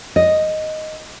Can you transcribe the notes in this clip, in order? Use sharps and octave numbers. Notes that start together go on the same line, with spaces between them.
D#5